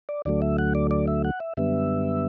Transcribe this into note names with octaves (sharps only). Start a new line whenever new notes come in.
D5
D2 D3 F#3 A3 D5
E5
F#5
D5
D5
E5
F#5
E5
F#2 D3 G3 B3 E5